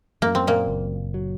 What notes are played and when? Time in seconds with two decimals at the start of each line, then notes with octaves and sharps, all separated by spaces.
0.22 F#2 A#3
0.35 C4
0.47 A#2 A#3
0.68 F#1
1.14 F#3